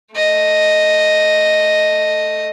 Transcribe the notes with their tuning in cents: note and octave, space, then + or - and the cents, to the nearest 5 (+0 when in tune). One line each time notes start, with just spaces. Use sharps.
A3 +0 D#5 +0